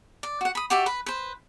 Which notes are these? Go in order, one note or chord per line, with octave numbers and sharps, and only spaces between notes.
D5
F#4 F#5
B5 D#6
F#4 G4 D5 E5
B4 B5
B4 C5